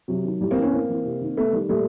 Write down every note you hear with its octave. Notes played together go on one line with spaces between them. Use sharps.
C3 F#3
D#3
A2 G3
A#3 C4
E3
B3 C#4
A2 A#3 C4
E3
C3
D#3
C3 A3 B3
D#3 G3
A#2 G3 A3